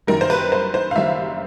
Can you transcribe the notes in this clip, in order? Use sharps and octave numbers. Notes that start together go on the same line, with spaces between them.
F#1 F#2 D#3 G3 A#4
C5
B4
C5
C5
F5
F#1 F#2 D#3 G3 E5